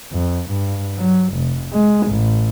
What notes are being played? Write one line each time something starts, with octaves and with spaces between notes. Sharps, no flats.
F2
G2
F#3
F1
G#3
A1